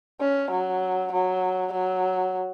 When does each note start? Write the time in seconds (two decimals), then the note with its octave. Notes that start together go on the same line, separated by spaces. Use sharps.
0.20 C#4
0.51 F#3
1.12 F#3
1.73 F#3